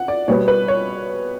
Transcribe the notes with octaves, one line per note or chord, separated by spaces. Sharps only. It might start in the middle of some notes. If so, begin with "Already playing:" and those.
Already playing: F#5
D5
B2 G3 B3 C#5
B4
C#5